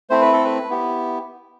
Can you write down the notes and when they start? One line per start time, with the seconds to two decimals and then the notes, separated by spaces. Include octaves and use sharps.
0.10 A3 C4 E4 C5
0.22 B4
0.33 A4
0.45 B4
0.70 B3 E4 G4